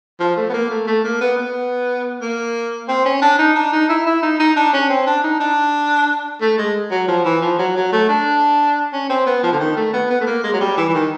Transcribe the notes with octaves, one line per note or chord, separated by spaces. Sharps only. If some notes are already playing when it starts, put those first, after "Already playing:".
F3
A3
B3
A#3
A3
A3
A#3
B3
B3
A#3
C4
C#4
D4
D#4
D4
D#4
E4
E4
D#4
D#4
D4
C#4
C4
D4
D#4
D4
A3
G#3
F#3
F3
E3
F3
F#3
F#3
A3
D4
C#4
C4
B3
F3
D3
D#3
A3
B3
B3
A3
A#3
G#3
F#3
G3
E3
E3
D#3